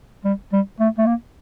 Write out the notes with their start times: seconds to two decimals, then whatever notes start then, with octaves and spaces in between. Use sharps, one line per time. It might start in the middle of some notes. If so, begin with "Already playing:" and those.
0.24 G3
0.52 G3
0.80 A3
0.98 A3
1.06 A#3